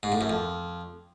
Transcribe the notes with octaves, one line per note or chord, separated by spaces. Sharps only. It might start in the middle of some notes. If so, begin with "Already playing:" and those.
G#2
A2
F#2
F2